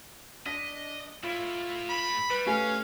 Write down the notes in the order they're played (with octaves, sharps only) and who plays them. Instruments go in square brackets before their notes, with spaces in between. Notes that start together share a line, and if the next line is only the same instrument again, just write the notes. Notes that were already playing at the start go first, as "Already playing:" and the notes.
[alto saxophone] D4 [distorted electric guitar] D#5 [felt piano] B6
[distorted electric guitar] A2 E4 [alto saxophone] F4
[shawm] B5
[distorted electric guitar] G3 [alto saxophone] B4
[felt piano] A3 G4 G#5 [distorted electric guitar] C#4 [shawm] F5